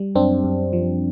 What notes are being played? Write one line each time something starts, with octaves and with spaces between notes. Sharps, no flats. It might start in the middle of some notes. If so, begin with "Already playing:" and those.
Already playing: G3
F#2 C4 D4
F#2
F3